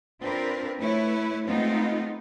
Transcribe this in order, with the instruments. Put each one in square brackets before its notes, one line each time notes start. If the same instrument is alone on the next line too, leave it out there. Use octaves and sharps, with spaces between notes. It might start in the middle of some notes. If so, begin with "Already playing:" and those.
[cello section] C4 D4 F4 A#4 B4
A3 E4 B4 C#5
G#3 A3 B3 C4 D#4 F4